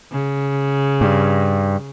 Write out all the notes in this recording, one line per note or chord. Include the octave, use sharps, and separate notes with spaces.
C#3
G2